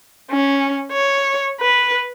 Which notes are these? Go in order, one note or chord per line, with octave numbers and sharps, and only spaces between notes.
C#4
C#5
B4